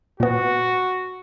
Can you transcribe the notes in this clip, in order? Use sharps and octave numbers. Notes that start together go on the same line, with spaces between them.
A#2 B3 F#4